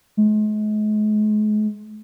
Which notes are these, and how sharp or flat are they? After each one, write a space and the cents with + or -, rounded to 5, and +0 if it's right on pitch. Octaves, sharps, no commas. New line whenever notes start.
G#3 +40